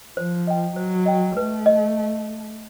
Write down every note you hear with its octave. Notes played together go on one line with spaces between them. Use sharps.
F3 C5
D#5 G5
F#3 C5
D#5 G5
A3 B4
D#5